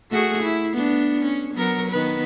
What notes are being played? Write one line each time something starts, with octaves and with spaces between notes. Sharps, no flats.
A3 F#4 G#4
E4
B3 D4
C#4
F#3 B3 A#4
D#3 B3 B4